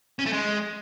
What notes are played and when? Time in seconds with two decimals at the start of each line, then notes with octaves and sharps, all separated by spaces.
0.19 C#4
0.26 A3
0.33 G#3